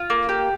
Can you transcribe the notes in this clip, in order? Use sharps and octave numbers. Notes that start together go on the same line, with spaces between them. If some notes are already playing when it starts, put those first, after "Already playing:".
Already playing: F4
A#3
G4